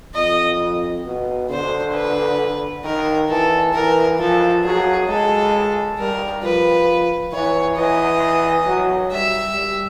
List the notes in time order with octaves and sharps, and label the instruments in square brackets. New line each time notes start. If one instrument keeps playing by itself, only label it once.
[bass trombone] F2 [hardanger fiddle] D#5
[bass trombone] B2
[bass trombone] D3 [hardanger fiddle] C5
[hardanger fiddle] B4
[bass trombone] D#3 [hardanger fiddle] A#4
[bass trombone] E3 [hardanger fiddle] A4
[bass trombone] E3 [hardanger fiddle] A#4
[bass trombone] F3 [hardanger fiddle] A4
[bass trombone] F#3 [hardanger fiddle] G#4
[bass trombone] G#3 [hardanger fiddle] A4
[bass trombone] G3 [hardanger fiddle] A#4
[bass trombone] F3 [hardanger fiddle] B4
[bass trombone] E3 [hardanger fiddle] C#5
[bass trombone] E3 [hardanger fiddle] D#5
[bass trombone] F#3
[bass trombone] G3 [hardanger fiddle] E5
[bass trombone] G3